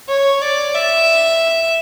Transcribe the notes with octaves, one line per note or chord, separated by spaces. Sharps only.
C#5
D5
E5